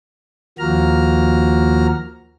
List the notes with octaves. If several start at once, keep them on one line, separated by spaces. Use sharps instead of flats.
D#2 F3 A#3 F#4 A#5 F6